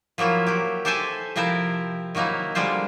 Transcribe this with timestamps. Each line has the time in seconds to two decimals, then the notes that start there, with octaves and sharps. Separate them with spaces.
0.18 F3 F#3 A#3 E4 F4
0.46 F#3 G4
0.85 G4 A4 C5 E5 G#5 A5
1.36 C3 F3 E4 A#4 G5 A5
2.15 D#3 F#3 A#3 D#4 E4
2.55 D3 G3 G#3 F4 C5